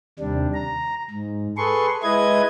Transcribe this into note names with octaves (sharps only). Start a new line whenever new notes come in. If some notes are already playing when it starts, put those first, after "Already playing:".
D#2 C3 G3 D4
A#5
G#2
G#4 A4 B4 C6 C#6
G#3 E4 B4 D#5 G#6